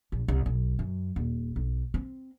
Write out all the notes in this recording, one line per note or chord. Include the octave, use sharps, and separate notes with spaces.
A#1
C2
B1
F#2
D#1
B1
C4